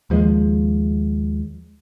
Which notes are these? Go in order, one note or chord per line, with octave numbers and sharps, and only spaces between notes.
D#2 F3 F#3 G#3